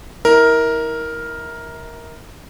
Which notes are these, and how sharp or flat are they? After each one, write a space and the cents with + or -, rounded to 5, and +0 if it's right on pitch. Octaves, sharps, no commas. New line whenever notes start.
E4 -35 A#4 +5